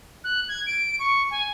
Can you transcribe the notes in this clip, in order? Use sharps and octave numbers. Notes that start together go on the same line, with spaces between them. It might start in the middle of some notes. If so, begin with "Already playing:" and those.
F#6
G#6
D7
C#6
G#5